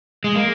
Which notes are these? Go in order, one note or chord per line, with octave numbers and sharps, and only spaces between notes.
G#3
A#3